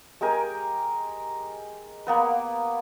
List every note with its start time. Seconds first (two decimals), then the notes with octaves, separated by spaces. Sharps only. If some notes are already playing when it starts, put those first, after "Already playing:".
0.21 G#3 G4 A#4 G#5
2.07 A#3 B3 B4